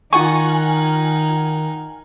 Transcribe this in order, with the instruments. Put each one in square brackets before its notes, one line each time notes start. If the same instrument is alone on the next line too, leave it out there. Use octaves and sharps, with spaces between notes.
[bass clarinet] D#3 [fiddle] D#4 [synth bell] F4 F#5 G#5 [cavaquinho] C#6